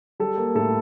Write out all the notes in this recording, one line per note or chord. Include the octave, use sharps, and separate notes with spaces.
G3 A4
A#3
A2 A4